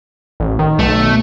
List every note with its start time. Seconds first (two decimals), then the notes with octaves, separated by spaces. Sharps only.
0.40 A1
0.59 D#3
0.79 B1 A3